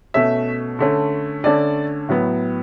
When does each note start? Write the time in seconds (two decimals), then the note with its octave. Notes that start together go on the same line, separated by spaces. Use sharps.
0.14 B2 A3 C#4 E5
0.79 D3 A3 C#4
1.44 D3 A3 C#4 D5
2.09 A2 F#3 B3